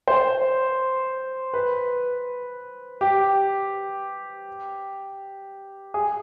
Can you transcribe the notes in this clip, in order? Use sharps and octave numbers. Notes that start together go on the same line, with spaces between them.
C5
B4
G4
G#4